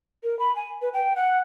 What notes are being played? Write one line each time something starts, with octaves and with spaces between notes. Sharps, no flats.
A#4
B5
G#5
B4
G5
F#5